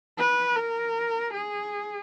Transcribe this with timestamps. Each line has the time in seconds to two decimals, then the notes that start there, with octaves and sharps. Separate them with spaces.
0.18 B4
0.56 A#4
1.33 G#4